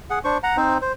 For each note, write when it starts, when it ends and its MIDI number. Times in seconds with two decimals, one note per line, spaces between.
0.10 0.19 68
0.10 0.19 78
0.24 0.38 62
0.24 0.38 72
0.24 0.38 85
0.43 0.57 78
0.43 0.57 82
0.57 0.78 60
0.57 0.78 63
0.57 0.78 72
0.82 0.93 72